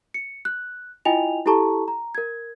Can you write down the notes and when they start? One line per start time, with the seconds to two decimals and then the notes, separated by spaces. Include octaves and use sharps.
0.14 C#7
0.45 F#6
1.05 E4 F4 D#5 G5 G#5 F7
1.46 E4 G4 A4 A5 A#5 C#6
1.88 A#5
2.15 A#4 G#6